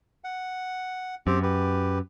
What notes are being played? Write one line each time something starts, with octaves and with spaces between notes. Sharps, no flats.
F#5
F#2 C4 G4
G4 B4